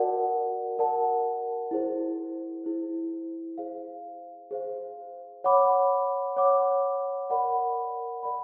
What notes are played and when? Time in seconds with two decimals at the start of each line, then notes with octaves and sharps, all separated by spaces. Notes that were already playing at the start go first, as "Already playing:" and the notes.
Already playing: F#4 A#4 D5 F#5 A5
0.78 F#4 A#4 D5 F#5 A5
1.71 E4 G#4 C5
2.64 E4 G#4 C5
3.58 G#4 C5 F5
4.51 G#4 C5 F5
5.44 C#5 F#5 B5 D6
6.37 C#5 F#5 B5 D6
7.30 A#4 D5 F#5 B5
8.23 A#4 D5 F#5 B5